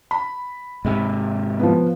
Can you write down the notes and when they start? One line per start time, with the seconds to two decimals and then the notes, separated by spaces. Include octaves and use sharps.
0.11 B5
0.85 G#2 C3
1.59 F3 B3